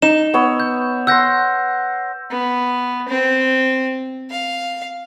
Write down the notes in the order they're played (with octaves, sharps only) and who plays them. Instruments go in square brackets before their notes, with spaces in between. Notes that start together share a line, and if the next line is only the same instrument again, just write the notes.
[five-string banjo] D#4 [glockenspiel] E7
[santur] B3 C#5 E6
[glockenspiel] G6
[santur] F#5 C6 [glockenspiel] E6 G6 A#6
[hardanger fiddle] B3
C4
F5